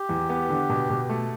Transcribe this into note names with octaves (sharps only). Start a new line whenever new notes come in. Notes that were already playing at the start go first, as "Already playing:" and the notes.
Already playing: G4
E2
B3
D3
B2
B2
A3